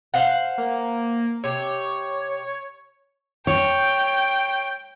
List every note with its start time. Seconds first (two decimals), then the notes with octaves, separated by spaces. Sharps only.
0.14 C5 F5 F#5
0.58 A#3
1.44 C3 G4 C#5
3.47 C#5 G5